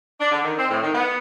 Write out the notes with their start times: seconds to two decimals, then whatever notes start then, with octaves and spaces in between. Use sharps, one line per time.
0.20 D4
0.32 D3
0.44 D#3
0.57 C4
0.70 A2
0.82 D#3
0.94 B3